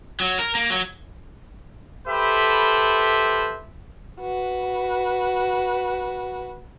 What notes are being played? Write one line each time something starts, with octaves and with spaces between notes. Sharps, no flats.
F#3
A#4
A#3
F#3
G4 A4 B4 C5 E5 B5
F#4 B4